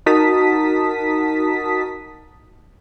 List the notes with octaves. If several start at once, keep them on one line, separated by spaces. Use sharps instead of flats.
D#4 F#4 A#4 A5 D#6 B6